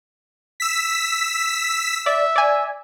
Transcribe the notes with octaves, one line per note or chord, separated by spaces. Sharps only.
E6 B6
D5 E5
D5 G#5